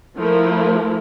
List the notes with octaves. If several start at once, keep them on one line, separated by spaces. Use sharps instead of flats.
F3 A3 E4 A#4